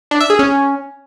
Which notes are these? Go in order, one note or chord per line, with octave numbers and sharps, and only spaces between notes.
D4
E5
G#4
C#4